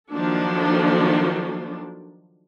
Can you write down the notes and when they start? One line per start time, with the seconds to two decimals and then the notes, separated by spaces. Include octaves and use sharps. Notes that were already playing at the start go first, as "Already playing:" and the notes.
0.12 D#3 F3 F#3 A#3 D4 A4